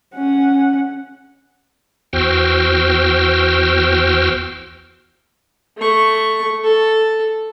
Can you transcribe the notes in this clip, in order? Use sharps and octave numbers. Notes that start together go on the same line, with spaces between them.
C#4 F#5
E2 F#4 C5 G5 E6 F6
A3 C#6
A4